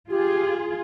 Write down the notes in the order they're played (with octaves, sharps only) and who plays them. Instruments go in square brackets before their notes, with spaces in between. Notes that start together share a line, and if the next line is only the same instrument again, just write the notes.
[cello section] F4 G#4 [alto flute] G4